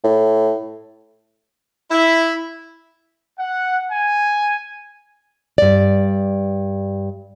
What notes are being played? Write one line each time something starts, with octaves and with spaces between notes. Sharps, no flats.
A2
E4
F#5
G#5
G2 D5